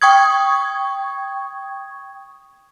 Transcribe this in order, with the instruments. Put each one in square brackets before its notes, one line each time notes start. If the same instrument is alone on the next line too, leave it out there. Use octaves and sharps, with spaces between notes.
[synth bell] G5 C#6 D#6 G#6